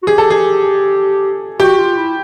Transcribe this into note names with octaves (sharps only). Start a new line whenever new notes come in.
F#4
G4 G#4
A4
G#4
F#4 G4
F4
E4